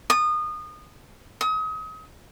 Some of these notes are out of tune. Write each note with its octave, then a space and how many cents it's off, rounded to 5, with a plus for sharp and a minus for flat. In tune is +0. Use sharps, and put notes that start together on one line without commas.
D#6 -25
D#6 +35